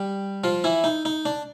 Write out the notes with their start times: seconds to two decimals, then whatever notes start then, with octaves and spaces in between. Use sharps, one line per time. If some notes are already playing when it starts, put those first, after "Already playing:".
Already playing: G3 G4
0.44 F3 F4
0.64 E3 E4
0.84 D#4
1.05 D#4
1.25 D4